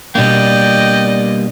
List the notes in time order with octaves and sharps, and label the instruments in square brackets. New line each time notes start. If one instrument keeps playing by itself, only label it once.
[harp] B2 D4 [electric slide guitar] G3 A#3 [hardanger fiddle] D5 D#5 [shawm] G5